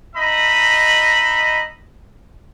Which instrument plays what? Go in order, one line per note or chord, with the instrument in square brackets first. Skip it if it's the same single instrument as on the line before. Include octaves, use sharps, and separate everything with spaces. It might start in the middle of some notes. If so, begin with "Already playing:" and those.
[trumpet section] D#4 D#5 E5 B5